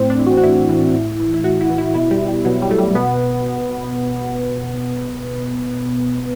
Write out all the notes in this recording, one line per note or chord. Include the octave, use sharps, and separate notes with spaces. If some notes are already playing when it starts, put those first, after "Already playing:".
Already playing: A2 C4
D4
E3
F#4
F#4
A2 E4
E3
A2
E3
E4
A2 F#4
E4
E3
E4
B2 E4
G3
G3
B2 F#3
G3
A3
G3
B2 B3